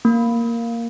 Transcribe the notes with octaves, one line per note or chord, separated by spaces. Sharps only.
A#3